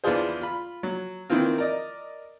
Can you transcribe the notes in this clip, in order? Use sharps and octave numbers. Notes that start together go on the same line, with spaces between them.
E2 B3 D4 F4 G#4 C5
F4 B5
F#3
D#3 E3 A#3 C4 F4
A#4 D5 D#5